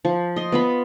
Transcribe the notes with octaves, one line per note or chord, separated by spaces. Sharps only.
F3
D#5 C6
B3 F4 B5